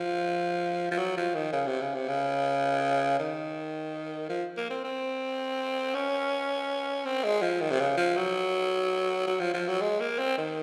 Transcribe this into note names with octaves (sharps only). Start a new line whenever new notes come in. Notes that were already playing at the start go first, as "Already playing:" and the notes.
Already playing: F3
F3
F#3
F3
D#3
C#3
C3
C#3
C3
C#3
D#3
F3
A#3
C4
C4
C#4
C4
G#3
F3
D#3
C3
C#3
F3
F#3
F#3
F3
F3
F#3
G#3
A#3
C4
D#3